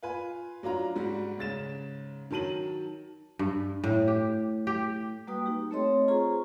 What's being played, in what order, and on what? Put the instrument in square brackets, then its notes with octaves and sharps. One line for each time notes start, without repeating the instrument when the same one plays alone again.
[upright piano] F4 B4 G#5
F#3 D4 F4 A#5
G#2 G3 F#4
G#2 C#3 A6 E7
D#3 F#3 A5 D#7 F#7
[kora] G2
A2
G4
G4
[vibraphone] G3 A#3 F#4 B4 G5 D#6
D#4 G4
A3 C4 A4 C#5 D#5 C6
F4 G#4 C5 A#5 C#6